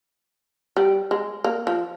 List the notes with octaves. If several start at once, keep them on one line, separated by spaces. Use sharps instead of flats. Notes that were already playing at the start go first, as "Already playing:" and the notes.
G3
G#3
A#3
F3